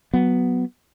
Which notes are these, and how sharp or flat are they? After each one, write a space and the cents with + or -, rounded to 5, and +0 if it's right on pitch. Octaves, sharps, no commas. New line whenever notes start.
F#3 +0 B3 +0